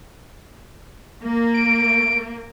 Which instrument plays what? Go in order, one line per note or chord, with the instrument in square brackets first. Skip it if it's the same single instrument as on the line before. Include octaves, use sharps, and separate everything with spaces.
[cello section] A#3
[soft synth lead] D7